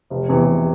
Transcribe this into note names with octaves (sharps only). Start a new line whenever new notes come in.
F1
E2 C3 E3
F1